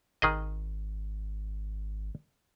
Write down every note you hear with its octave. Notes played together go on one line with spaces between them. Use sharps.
G#1 D#3 G#4 D#5